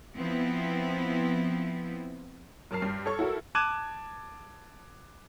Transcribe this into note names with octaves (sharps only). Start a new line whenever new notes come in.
F3 B3 C4 E4
F#2 A#4 A5 F6 C7
G2 C7
A4 C#5 C#6
E4 F#4 A4 A#4
A5 D6 F#6 G#6 D#7 E7